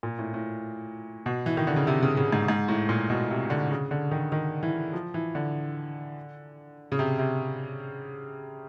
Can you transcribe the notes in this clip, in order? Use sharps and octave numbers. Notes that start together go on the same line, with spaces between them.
A#2
A2
A2
B2
E3
D#3
D3
C#3
C3
C#3
C#3
G#2
G#2
A2
A#2
B2
C3
D3
C#3
D3
D#3
D#3
E3
F3
E3
D3
C#3
C3
C3